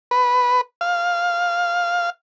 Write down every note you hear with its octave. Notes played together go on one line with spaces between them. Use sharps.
B4
F5